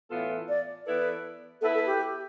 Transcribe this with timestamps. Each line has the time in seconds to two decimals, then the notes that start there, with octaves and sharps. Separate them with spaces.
0.10 A2 E3 B3 F4 A4
0.49 D5
0.86 E3 B3 E4 A4 B4 D5
1.61 B3 E4 A4 B4 E5
1.74 A4
1.86 G4